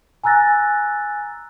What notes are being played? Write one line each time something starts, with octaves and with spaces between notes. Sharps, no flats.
G#5 A#5 E6 F#6 A6 A#6